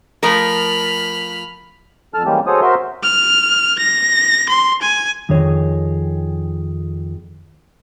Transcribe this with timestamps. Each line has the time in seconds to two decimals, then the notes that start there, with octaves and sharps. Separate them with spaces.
0.23 F3 A3 A#4 B5 F6
2.14 F2 A4 A5 F6
2.26 E3 G3 G#3 A#3 C#4 G4
2.47 F#4 G#4 A4 C5 C#5 D#6
2.61 F#4 A#4 C5 E5 C6
3.03 F6
3.79 A#6
4.49 C6
4.82 G#5
5.29 F2 D#3 D#4 G#4 C#5